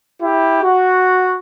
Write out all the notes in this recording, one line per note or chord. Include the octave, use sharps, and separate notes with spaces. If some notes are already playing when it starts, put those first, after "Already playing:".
E4 G4
F#4